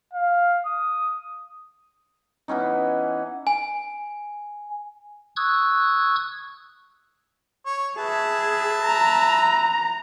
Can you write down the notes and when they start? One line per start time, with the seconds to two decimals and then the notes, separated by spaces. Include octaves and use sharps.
0.13 F5
0.66 D#6
2.48 E3 B3 C#4 D#4
3.47 G#5
5.36 C#6 D#6 E6 F#6 G#6
7.66 C#5
7.98 G#4 B4 E5 A5
8.82 A#5